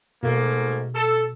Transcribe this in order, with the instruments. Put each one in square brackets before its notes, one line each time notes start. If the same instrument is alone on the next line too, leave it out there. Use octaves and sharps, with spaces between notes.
[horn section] G#2 A3 A#3 [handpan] B2
[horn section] A4